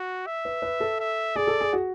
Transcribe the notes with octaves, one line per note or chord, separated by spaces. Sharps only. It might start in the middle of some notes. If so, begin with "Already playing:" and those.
Already playing: F#4
E5
B4
B4
A4
E5
G#4 D5
A4
G#4
F#4